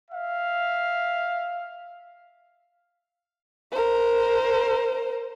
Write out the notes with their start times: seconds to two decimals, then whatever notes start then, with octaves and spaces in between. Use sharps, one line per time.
0.11 E5 F5
3.72 A#4 C5